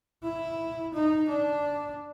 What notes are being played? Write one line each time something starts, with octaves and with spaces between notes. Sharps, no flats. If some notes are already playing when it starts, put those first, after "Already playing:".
E4
D#4
D4